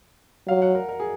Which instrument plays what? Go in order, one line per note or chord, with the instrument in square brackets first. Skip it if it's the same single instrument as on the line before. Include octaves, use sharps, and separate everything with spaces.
[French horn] F#3 [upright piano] F5
[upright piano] F#5
A#4
A#4
G#4